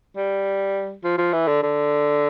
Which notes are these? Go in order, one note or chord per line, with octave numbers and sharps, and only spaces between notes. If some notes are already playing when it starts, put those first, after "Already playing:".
G3
F3
F3
E3
D3
D3